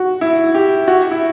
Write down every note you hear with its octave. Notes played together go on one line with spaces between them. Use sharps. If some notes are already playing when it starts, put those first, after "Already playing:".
Already playing: F#4
E4
G4
F#4
E4